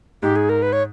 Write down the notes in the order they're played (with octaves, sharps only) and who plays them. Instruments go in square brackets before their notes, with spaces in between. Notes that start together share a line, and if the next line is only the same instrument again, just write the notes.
[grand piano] G#2 [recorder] G4
[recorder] G#4
A#4
B4
C#5